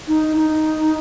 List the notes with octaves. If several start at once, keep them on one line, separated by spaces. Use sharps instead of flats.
D#4
D#4